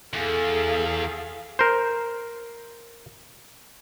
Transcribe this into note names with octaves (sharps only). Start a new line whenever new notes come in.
E2 G#4 A4 F5
A#4 C5